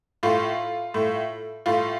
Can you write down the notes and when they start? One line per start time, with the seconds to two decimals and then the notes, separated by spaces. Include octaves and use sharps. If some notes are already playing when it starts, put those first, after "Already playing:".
0.23 A2 F4
0.94 A2
1.66 A2 F4